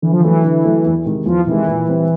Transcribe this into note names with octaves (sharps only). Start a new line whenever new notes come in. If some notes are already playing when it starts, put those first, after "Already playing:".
D3 E3
F3
E3 F#3 A3
D3
F#3 A3
E2
C3 D#3 G#3
E2 F3
C3 D#3 E3 G#3
A#2
G3 C4